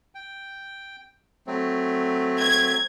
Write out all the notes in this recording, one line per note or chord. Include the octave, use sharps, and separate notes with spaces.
G5
F#3 A3 C4
G#6